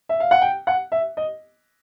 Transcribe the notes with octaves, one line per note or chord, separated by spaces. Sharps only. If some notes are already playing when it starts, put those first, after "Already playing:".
E5
F5
F#5
G5
F#5
E5
D#5